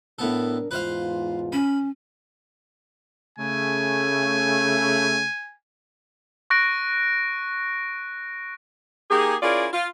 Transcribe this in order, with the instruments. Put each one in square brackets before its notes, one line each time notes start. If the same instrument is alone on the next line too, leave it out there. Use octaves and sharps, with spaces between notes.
[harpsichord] A2 B3 A4 [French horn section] D4 A#4
[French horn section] E2 G#2 F4 [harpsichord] B4 C5 F5
[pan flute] C#4 [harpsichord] B5
[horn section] C#3 A3 [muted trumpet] G#5
[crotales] C#6 F#6 A#6 D7
[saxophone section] A#3 D#4 G4 G#4
C#4 E4 F4 G#4 A#4 D5
F4